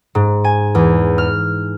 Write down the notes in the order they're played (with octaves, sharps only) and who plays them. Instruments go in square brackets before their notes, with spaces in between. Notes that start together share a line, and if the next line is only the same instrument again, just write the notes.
[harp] G#2
G#5
E2
F6